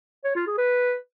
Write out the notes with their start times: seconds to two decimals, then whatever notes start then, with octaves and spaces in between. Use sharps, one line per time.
0.24 C#5
0.35 F4
0.47 G#4
0.58 B4